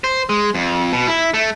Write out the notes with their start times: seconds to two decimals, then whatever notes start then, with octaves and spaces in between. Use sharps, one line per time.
0.04 C5
0.29 G#3
0.55 F2
0.93 B2
1.08 E4
1.34 A3